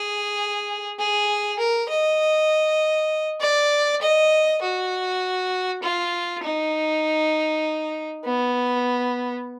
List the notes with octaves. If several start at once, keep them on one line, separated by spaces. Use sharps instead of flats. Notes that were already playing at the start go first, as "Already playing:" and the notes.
Already playing: G#4
G#4
A#4
D#5
D5
D#5
F#4
F4
D#4
B3